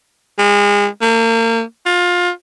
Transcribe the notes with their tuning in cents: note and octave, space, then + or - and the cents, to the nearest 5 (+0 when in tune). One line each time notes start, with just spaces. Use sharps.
G#3 -30
A#3 -35
F4 +25